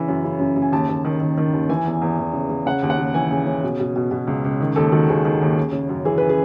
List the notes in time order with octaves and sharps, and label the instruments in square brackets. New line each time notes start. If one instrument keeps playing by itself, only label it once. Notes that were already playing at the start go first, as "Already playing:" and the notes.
Already playing: [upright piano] C#3 E3 B5
F#2
C#3
F#2
C#3
G#5
D#2 A5
D#2
D#3
D#3
D#3
D#2
E3 G#5
E2
E2
E2
C#3
C#3
C#3 F#5
D#2
F#5
C#3
E3 G#5
C#3
C#3
B2
B2
B2
B2
C#2
C#2
D#3
D#2 A4
D#3 F#4
D#2 G#4
D#3
D#2
C#3
C#3
F#2
E3 G#4
B4
G#4